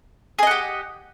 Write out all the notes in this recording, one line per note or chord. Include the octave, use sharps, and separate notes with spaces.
G4 G#4 D#5 F#5